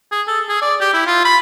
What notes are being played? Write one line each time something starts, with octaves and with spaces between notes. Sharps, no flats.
G#4
A4
G#4
D5
G4
E4
F4
B5